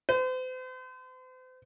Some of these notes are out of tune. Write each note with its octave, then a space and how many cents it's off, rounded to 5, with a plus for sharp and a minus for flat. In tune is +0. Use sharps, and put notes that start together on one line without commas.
C5 -40